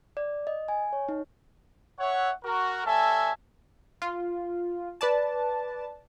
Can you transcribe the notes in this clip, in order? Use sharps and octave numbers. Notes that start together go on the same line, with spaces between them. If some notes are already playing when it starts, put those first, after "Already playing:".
D5
D#5
G#5
C#5
D#4
C#5 E5 F#5
F#4 A#4
G3 C#4 A4 E5 G#5 A5
F4
B4 D5 A5